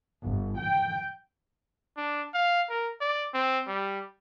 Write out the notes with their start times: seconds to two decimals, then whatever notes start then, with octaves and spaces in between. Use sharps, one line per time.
0.23 G1
0.58 G5
1.97 D4
2.34 F5
2.70 A#4
3.01 D5
3.34 C4
3.68 G3